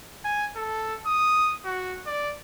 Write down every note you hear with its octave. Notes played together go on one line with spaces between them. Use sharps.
G#5
A4
D#6
F#4
D5